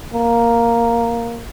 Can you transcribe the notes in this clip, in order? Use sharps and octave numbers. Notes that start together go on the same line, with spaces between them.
A#3